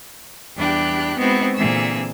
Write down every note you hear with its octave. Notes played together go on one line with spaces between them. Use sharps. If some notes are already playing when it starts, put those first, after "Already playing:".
E2 G3 D4 G4 B5 F#6
G#3 B3 C4 D#4 E4 F#4
A#2 D3 E3 C4 G#4 E6